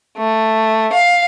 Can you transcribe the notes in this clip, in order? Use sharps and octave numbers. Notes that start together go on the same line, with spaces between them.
A3
F5